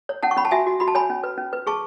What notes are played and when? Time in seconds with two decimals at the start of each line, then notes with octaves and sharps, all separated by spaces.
0.09 C#5
0.23 C#4 F#5 A5
0.31 C#6
0.37 C#4 B5
0.45 A5
0.51 F#4 E5 G#5
0.67 F#4
0.80 F#4 B5
0.88 A5
0.95 C#5 G#5 B5
1.10 C#4
1.24 B4
1.38 C#4
1.53 B4
1.67 G#4 A5 C#6